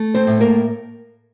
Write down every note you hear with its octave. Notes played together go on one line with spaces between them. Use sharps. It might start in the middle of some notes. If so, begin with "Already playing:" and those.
Already playing: A3
C4 C5
A2
A#3 A#4